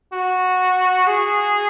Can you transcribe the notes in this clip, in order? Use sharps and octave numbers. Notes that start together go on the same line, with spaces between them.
F#4
G#4